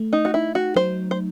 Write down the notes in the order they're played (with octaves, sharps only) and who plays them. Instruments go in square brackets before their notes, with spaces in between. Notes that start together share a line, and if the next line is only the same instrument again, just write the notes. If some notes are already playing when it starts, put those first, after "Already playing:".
Already playing: [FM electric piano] A3
[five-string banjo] D#4
F#4
[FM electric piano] D#4 [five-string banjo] E4
[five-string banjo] F#4
[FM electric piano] F#3 [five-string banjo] C5
[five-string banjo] C5